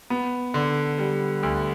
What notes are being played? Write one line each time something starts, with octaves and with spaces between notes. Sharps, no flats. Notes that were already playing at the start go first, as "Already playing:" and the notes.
B3
D3
G3
D2